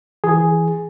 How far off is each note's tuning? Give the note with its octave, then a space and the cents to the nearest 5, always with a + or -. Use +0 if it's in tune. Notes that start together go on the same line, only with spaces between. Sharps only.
E3 +0 G#4 +0